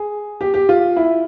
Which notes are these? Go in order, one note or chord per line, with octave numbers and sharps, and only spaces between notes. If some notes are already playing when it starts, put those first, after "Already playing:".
Already playing: G#4
G4
G4
F4
E4